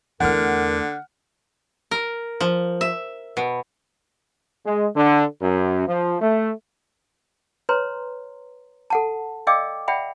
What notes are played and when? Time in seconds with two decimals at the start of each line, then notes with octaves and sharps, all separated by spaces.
0.20 E2 D3 A3 A#4 F#5 F6
1.91 A#4
2.41 F3
2.81 E5
3.37 B2
4.66 G#3
4.95 D3
5.41 F#2
5.88 F3
6.21 A3
7.69 B4 C#5 A#5 C6
8.90 A4 F#5 A5
9.47 D5 D#5 F5 G5 D6 E6
9.88 D5 E5 F#5 G5 B5